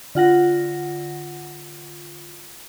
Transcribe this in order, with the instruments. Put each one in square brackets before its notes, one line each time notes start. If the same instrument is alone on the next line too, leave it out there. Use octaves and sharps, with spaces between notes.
[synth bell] D3 F4 F#5 A#6